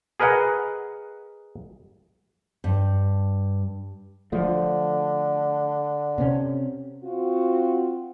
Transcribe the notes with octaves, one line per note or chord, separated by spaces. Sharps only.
G#4 A#4 B4 D#5 F#5
G2
D3 F3 A3
C3 C4 C#4
C4 F4 F#4